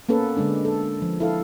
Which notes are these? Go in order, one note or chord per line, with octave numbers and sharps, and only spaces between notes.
A#3 B3 C#4 A4 B4
D3 G#3 D4
A4
F3
E4 A4 F5